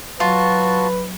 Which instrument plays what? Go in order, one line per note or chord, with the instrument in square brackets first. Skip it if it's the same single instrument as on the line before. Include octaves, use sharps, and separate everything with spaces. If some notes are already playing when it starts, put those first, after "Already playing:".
[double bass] F#3 [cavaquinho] F4 [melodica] F#4 A5 C#6 [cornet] B4